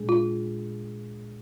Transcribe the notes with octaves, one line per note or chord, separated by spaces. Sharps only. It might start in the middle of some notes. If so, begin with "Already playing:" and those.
Already playing: A#2 G#3 D4 G#4
F4